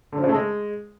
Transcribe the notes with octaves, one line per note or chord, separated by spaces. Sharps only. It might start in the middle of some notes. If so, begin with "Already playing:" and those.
D3
F3
C#3
A3
G#3